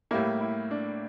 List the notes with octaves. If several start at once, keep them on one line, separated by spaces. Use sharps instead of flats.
A2 G3 A#3 E4
E4
D4